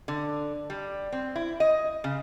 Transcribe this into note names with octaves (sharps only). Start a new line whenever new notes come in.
D3
G3
C4
E4
D#5
C#3